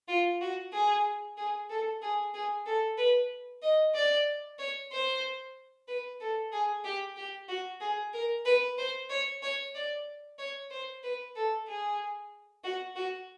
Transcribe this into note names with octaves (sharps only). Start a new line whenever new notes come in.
F4
F#4
G#4
G#4
A4
G#4
G#4
A4
B4
D#5
D5
C#5
C5
B4
A4
G#4
G4
G4
F#4
G#4
A#4
B4
C5
C#5
C#5
D5
C#5
C5
B4
A4
G#4
F#4
F#4